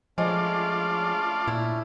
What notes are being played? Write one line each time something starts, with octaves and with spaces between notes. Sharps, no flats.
F3 G#3 A3 C#4 D4 F4 D5
A#2 E4